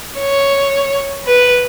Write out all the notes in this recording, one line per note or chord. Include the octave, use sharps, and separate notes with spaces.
C#5
B4